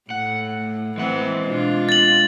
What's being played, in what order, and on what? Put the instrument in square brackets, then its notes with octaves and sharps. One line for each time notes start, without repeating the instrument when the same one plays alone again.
[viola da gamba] A2 [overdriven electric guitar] F#5
[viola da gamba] E3 C4 [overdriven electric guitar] G#3 F#5
[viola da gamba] B2 D4 F4
[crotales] A6 F#7